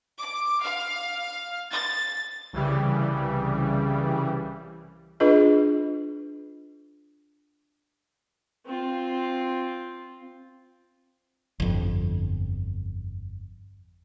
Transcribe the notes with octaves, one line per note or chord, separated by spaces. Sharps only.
D6
F5
A6
C2 C#3 E3 G3
D4 F4 G#4 B4 D#5
C4 F4
G1 F2